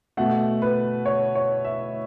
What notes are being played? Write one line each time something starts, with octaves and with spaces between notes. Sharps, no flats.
B2 A3 F#5
B4
C#5
C#5
E5